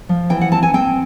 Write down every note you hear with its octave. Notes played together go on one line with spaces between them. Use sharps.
F3
E3 G5
F#5
C4 A5
G#5
C4 G5